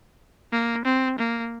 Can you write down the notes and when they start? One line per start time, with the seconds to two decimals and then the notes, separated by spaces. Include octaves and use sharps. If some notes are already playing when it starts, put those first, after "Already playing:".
0.52 A#3
0.85 C4
1.19 A#3